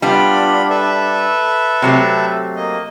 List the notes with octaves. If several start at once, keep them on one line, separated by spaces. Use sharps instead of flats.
G3 B3 D4 F4 B5
A4 B4 E5
C3 F#3 A3
A#3 D#5